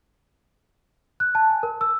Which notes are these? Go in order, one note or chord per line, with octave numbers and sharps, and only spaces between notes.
F#6
A5
G#5
A#4
E6